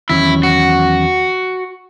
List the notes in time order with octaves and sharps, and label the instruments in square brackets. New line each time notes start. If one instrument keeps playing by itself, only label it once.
[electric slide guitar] E2 D#3 F#3 C#4 [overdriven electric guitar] E4
[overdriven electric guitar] F#4